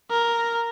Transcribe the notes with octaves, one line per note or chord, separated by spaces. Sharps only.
A#4